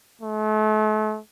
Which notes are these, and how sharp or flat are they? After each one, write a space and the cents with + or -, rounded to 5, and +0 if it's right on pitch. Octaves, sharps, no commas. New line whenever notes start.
A3 -40